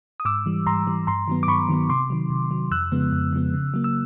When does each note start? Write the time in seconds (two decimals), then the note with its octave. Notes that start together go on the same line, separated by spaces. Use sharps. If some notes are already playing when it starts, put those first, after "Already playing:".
0.20 D#6
0.25 G#2 D6 E6
0.46 E3 G3
0.67 G#2 A#5 C6
0.87 E3 G3
1.07 G2 A#5 C6
1.28 D#3 F#3 B3
1.43 D6
1.48 G2 B5 C#6
1.69 D#3 F#3 B3
1.90 C3 C6 D6
2.10 D#3 F#3
2.30 C3
2.51 D#3 F#3
2.71 F2 E6 F#6
2.92 C#3 F3 G#3 B3
3.13 F2
3.33 C#3 F3 G#3 B3
3.54 C#3
3.74 F#3 A#3
3.84 E6